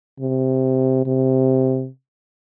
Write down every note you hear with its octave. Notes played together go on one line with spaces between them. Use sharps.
C3
C3